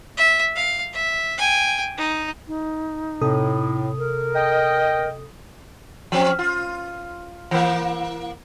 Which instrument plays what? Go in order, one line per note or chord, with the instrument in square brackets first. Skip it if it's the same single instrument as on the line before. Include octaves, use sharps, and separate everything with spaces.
[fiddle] E5
F5
E5
G5 G#5
D#4
[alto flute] D#4
[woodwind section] A2 [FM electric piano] C3 A4 D#6
[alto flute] A#4
[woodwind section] D#5 G5
[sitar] F3 C4 C#4
F4
E3 A#3